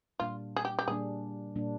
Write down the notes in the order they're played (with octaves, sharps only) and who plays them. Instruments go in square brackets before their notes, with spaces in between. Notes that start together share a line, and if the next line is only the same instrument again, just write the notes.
[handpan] A#2 G3 A#3 D4 [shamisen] F4
[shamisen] G#4
G4
G4
[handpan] A#2 G3 A#3 D4 [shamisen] G#4
[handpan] A#2 G3 A#3 D4